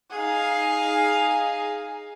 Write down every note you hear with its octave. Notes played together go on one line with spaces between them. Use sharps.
D#4 G#4 F5